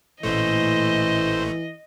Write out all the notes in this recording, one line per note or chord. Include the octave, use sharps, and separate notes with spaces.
A1 A#2 E3 A3 C5 D#5 C6